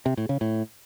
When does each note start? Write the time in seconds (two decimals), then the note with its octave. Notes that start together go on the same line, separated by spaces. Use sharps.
0.06 C3
0.17 A2
0.29 C#3
0.41 A2